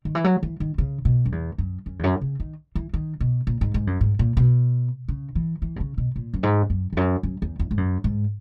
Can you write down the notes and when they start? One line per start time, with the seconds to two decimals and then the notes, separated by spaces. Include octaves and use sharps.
0.05 D#3
0.15 E3
0.24 F#3
0.43 E3
0.60 D#3
0.78 C#3
1.05 B2
1.26 F#2
1.32 E2
1.58 F#2
1.86 F#2
1.99 E2
2.04 F#2
2.21 C#3
2.40 D#3
2.75 E3
2.94 D#3
3.20 B2
3.47 A#2
3.61 G#2
3.74 G#2
3.87 F#2
4.01 G#2
4.19 A#2
4.37 B2
5.08 C#3
5.35 E3
5.62 E3
5.76 B2
5.80 C#3
5.98 B2
6.16 A#2
6.33 F#2
6.43 G#2
6.70 F#2
6.93 E2
6.97 F#2
7.23 F#2
7.42 E2
7.59 E2
7.71 G#2
7.77 F#2
8.04 G#2